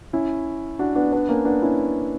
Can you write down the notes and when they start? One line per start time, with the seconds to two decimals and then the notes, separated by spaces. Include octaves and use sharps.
0.13 C#4 E4
0.79 D4 F#4
0.95 B3 D4
1.12 B3 D4
1.29 A#3 C#4
1.45 B3 D4
1.62 C#4 E4